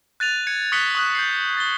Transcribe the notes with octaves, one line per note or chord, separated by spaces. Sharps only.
F#6 A6 D#7 F7
G#6 C#7
C#6 D#6 F#6 B6 C#7 G7
C#6 D#6 F#6
G6 C7
A6 G7